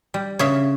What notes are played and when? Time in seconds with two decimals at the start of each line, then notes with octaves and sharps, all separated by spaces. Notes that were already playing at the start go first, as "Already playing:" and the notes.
0.14 G3
0.39 C#3 C#5 E5